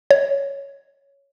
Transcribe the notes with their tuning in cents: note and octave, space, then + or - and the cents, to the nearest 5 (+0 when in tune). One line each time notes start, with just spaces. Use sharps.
C#5 +5